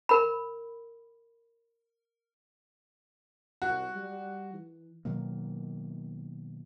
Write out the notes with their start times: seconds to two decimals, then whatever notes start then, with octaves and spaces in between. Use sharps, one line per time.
0.09 A#4 B5
3.62 C2 F#4
3.96 G3
4.54 E3
5.05 B2 D#3 F#3 A#3